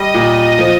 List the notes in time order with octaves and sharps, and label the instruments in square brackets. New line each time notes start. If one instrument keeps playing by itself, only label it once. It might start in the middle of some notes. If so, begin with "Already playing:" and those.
Already playing: [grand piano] G3 [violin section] D#5
[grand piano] A#2
F3